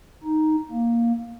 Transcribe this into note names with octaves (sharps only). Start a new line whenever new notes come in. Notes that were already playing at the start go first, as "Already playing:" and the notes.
D#4
A#3